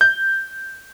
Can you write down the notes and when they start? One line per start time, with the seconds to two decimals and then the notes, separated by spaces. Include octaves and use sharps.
0.01 G6